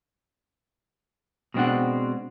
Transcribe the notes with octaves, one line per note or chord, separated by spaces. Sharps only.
B2 G#3 C4 D4 F#5